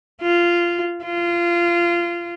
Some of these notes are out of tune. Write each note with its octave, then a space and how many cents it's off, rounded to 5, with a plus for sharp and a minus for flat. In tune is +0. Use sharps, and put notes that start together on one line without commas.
F4 -15
F4 -20